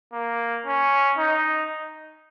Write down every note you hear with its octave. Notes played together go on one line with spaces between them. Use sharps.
A#3
C#4
D#4